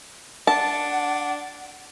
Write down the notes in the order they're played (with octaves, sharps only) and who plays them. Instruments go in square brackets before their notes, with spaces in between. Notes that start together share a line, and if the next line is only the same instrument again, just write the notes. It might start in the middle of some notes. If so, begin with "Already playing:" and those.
[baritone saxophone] D4 [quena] F#5 [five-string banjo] A5